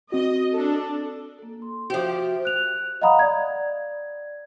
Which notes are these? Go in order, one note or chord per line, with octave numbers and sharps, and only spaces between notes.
C4 F#4 D#5
D4 A4
A#3 A4
C6
F3 F#4 G4 C5 E5
F#6 F7
D#5 F5 F#5 A#5 B5 D#6
D5 G#6